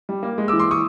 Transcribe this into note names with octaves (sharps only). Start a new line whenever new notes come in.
G3
A#3
G#3
D6 E6
E3
C6 D6
C#6 D#6